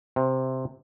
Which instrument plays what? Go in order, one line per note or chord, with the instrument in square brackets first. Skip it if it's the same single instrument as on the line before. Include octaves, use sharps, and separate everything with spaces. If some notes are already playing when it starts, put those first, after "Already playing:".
[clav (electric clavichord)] C3